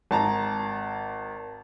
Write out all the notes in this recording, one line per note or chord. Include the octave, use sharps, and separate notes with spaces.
G#1 A5 A#5